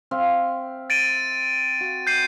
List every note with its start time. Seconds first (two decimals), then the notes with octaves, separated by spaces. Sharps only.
0.11 C4 E5 F5
0.90 A6 D7 D#7
1.80 F#4
2.07 G6 C7 D#7